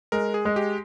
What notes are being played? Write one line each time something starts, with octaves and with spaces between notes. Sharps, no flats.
G#3 A#4
G#4
G#3
G4